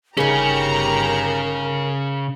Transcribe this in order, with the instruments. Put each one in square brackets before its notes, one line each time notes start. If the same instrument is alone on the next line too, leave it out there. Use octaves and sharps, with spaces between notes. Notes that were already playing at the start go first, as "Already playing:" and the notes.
[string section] G1 G4 A#5 [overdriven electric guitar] C#3 C#4 [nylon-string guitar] D#4 G#4 [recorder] A#4